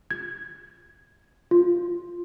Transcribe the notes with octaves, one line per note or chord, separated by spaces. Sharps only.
G#6
F4